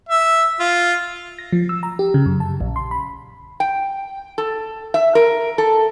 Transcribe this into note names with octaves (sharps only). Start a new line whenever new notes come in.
E5
F4
A#6
F3
E6
A#5
G4
C#3
F#2
A5
A#1
C6
B5
G5
A4
E5
A#4
A4